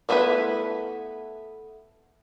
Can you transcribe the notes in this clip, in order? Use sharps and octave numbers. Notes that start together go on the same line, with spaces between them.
A3 B3 E4 F#4 B4